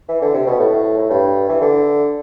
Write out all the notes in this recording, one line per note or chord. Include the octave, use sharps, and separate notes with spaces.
E3
D3
C3
B2
A2
A2
G2
E3
D3